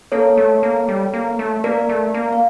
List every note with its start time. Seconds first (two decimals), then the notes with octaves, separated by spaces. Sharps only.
0.12 A#3 A4 C#5
0.37 A3
0.63 A#3
0.89 G3
1.14 A#3
1.39 A3
1.64 A#3 A#4 D5
1.89 A3
2.14 A#3
2.33 F5